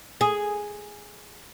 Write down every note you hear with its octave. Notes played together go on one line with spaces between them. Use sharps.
G#4